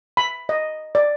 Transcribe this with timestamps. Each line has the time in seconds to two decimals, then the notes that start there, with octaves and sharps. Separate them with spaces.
0.17 B5
0.49 D#5
0.95 D5